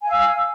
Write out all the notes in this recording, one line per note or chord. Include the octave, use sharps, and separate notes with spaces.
F5 G#5 E6